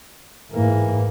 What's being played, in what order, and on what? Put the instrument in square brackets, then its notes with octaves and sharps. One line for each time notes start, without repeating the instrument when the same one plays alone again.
[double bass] G#2 A#3 [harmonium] E3